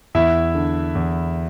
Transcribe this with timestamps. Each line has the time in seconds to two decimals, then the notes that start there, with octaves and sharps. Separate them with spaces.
0.15 E2 E4 E5
0.55 D3
0.95 E2